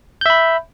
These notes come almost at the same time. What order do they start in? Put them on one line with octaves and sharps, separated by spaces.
G6 E5 B5